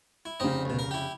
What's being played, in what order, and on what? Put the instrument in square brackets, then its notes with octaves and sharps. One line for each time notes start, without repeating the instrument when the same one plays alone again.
[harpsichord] E4
[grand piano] F1 C#3 [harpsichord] C4 D#4 D#5
[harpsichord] D2 B2
A#4
E4 G4